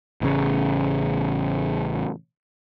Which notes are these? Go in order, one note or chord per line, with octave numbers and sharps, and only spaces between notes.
A1 C#3